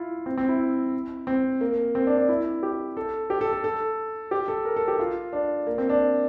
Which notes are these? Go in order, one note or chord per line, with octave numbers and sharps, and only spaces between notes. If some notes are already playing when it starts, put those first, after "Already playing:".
Already playing: E4 F4
C4
C4
E4
C4
A#3
C4
D4
D4
E4
G4
A4
G4
A4
A4
A4
G4
A4
A#4
A4
G4
F4
D4
A#3
C4
D4